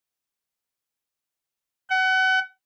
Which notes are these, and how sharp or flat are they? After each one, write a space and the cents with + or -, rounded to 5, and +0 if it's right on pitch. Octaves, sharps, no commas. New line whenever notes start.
F#5 +30